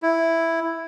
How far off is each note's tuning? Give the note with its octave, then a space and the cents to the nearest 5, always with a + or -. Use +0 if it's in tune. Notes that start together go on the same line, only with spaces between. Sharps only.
E4 +0